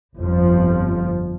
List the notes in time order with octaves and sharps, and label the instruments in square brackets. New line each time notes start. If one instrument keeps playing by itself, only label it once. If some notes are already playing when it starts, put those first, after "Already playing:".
[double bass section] G1 F2 F3